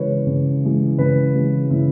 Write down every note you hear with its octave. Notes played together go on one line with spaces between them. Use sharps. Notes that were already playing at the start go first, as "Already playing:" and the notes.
Already playing: C#3 E3 G#3 B4 C#5
C#3
E3 G#3
C#3 B4
E3 G#3
C#3 E4